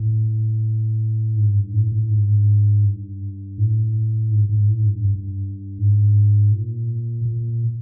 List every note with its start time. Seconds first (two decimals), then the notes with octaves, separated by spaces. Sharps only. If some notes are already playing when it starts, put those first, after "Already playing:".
Already playing: A2
1.36 G#2
1.55 G2
1.73 A2
1.92 A2
2.10 G#2
2.84 G2
3.58 A2
4.31 G#2
4.49 G#2
4.68 A2
4.86 G2
5.04 G2
5.78 G#2
6.52 A#2
7.25 A#2